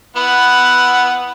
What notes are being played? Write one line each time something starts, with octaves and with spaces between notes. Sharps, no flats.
B3 E4 F#5